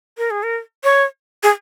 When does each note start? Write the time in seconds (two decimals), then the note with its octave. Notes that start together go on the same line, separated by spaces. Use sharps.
0.18 A#4
0.31 G#4
0.43 A#4
0.84 C#5
1.43 G#4